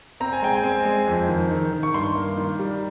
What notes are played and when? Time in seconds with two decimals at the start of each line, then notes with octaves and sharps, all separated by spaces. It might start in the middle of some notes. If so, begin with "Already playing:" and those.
0.20 C4 A#5
0.33 G#5
0.42 G#3 G5
0.56 G#5
0.64 C4
0.85 G#3
1.07 F2
1.29 D#3
1.51 D#3
1.73 D#3
1.83 C#6
1.94 G2 C6
2.15 A#3
2.37 D#3
2.59 G3